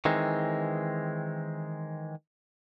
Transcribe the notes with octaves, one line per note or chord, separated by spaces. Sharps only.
D#3 E3 G#3 C4